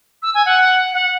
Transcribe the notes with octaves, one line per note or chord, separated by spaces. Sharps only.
E6
G#5
F#5
F#5